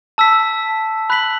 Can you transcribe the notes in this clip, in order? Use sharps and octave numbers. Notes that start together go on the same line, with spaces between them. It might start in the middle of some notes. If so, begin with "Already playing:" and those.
A5 E6 B6
B5 F#6 B6 F#7